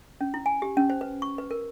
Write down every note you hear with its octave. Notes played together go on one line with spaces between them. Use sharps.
C#4
E4
G#5
G4
C#4
C5
B4
C#6
B4
A#4